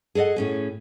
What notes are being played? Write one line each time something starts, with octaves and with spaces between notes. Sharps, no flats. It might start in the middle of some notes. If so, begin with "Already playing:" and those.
G#4 A4 D5 D#5 F#5
A2 C#4 G#4